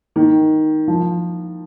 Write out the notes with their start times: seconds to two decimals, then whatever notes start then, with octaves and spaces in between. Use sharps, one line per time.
0.16 D#3
0.88 F3